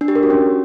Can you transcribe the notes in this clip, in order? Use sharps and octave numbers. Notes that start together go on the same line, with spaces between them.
D4
G4
A#4
F#4
C#4